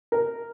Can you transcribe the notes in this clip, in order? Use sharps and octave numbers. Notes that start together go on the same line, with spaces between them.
A#4